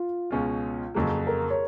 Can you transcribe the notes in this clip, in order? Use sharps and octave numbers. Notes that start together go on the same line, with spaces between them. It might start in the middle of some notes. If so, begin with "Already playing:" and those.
Already playing: F4
C#2 B2 G#3 C#4 F4
F2 C#3 F#3 A#3 G#4
A#4
C#5